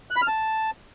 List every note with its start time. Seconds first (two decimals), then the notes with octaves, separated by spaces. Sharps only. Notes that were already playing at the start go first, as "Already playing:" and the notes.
0.11 F#6
0.16 B5
0.22 F6
0.27 A5